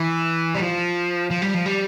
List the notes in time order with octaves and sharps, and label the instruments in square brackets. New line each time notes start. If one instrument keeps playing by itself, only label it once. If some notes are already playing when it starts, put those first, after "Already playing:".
Already playing: [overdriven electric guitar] E3
G3
F3
F3
G3
F3
G3